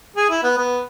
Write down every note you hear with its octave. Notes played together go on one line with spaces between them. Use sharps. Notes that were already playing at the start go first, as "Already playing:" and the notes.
G#4
E4
B3
B3